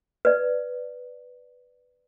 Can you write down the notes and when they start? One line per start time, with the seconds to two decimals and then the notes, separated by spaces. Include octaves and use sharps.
0.25 B4 D5